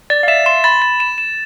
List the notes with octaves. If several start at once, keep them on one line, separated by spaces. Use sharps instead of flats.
D5 A6
F5
E5 E7
C6 E7
B5 A6
A6
E7
E7